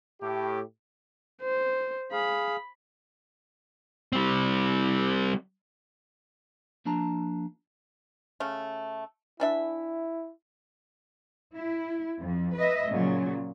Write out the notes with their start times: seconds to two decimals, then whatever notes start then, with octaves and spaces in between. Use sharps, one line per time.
0.21 A2 G4
1.43 C5
2.12 G#4 F5 B5
4.13 G3 C4
6.85 F3 A#3 D4 A5 A#5
8.40 C#3 A3
9.40 E3 D4 E4 E5
11.53 E4
12.20 F2
12.56 B4 D#5 E5
12.89 A#2 C#3 F#3